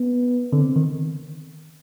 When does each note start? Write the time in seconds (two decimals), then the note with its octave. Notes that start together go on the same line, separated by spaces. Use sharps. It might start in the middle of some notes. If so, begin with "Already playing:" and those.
Already playing: B3
0.53 D3 C4
0.76 D#3